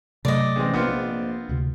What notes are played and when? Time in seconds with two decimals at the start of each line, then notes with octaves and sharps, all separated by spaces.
0.25 C3 F#3 A3 D5 D#5
0.56 A1 G#3 C4
0.74 A#1 B3 C4 F4
0.87 A#1
1.49 D2 C3